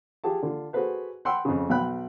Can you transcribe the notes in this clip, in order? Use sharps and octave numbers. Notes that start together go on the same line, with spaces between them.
F4 G4 G#4 A5
D3 F4
F#4 G#4 A4 B4 C5
F#5 G5 B5 C6 E6
F2 C#3
B1 B3 G5 B5 F#6